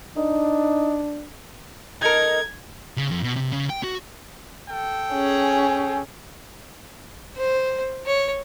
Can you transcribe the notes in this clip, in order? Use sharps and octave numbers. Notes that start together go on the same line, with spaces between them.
D4 D#4
D#4 A4 A#4 D#5 G#6
C#3
F2
B2
C3
C#3
G5
F#4
A4 G5
C#4 G#4
C5
C#5